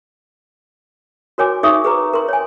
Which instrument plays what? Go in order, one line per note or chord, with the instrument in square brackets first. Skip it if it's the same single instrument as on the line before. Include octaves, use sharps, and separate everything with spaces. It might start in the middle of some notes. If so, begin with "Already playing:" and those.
[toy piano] F#4 A#4 C#5 G#5 D6
D#4 G#4 C#5 E5 C#6 D#6
G#4 B4 A#5
A#4 C6
C#5 G#5